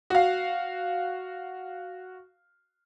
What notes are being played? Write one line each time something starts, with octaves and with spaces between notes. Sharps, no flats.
F#4 F5